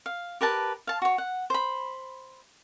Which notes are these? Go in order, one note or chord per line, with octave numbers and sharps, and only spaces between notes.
F5
G4 A#4 B4 A5
F5 A5
F#4 C#5
F#5
C5 B5